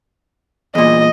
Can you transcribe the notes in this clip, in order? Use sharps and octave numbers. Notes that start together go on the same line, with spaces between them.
E2 A#2 D#5